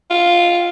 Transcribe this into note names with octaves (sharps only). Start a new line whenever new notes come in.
F4